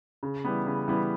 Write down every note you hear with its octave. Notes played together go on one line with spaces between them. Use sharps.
C#3
E3 G3 B3
C#3
E3 G3 B3